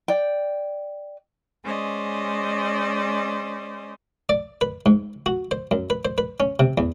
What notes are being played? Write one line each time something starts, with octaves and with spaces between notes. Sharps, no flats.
D5 G5
G#3 C#4 C5 D5 D#5
D5
B4
G#2
F#4
C5
F#2
B4
C5
B4
C#4
C3
E2